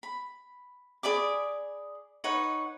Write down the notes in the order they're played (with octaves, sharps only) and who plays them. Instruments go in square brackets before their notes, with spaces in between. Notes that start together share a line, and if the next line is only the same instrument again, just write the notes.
[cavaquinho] B5
G#4 D5 B5 D6
D#4 B4 C#5 F#5